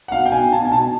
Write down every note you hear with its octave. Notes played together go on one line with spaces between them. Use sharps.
F#5
B2 F5
G5
B2 G#5
B2 A5
G#5
B2 A5